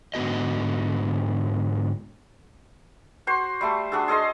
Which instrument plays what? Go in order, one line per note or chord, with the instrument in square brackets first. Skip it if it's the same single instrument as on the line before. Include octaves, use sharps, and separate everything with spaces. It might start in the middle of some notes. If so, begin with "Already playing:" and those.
[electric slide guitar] G#2 D3 B3 F#4 D#5
[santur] F#4 C5 C6
G3 A3 A4
D4 F#4 G#4 A4
G#4 A4 D#5 C6